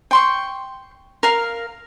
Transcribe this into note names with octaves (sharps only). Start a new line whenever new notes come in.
G5 C6 C#6
A#4 F5